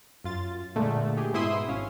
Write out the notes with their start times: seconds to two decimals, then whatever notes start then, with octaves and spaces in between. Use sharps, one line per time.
0.24 F#2 F4 A6
0.76 A#2 D3 G#3 A3
1.17 G4 G#4
1.33 G#2 B2 E4 E5 C6 D#6
1.68 G#1 C#4 F5